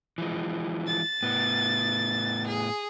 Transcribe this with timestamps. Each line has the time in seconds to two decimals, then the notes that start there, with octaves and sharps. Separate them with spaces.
0.18 E3 F3 G#3
0.87 A6
1.23 A2 B3
2.47 G#4